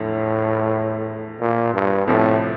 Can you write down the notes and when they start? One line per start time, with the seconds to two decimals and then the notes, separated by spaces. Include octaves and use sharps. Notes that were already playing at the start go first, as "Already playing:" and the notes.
Already playing: E2 A2 D3 F3
1.40 A#2
1.74 G2
2.07 C2 A2 C3 F3